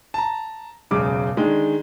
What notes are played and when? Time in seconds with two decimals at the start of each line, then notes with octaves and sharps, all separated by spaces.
0.14 A5 A#5
0.91 E1 C#2 F#2 C#3 D6
1.37 D3 D#3 G#3